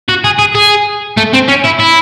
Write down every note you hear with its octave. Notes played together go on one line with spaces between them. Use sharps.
F#4
G#4
G#4
G#4
A3
C4
C#4
E4
E4